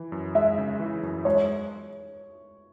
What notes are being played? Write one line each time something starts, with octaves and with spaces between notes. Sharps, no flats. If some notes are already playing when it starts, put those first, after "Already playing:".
Already playing: E3
F#2
G#3 E5
C#3
E3
F#2
G#3 C#5